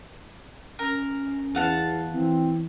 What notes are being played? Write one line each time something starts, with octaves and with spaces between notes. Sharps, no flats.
C#4 A#4
E2 F5 F#5 A5
E3 C4